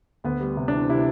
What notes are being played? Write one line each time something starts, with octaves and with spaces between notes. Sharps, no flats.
D2 B3
G3
C3
E3 D4
C3 E4